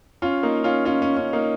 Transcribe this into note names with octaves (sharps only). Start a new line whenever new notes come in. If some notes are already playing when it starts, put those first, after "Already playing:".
C#4 F4
A#3 D#4
C#4 F4
C#4 F4
C#4
C#4
A#3 D#4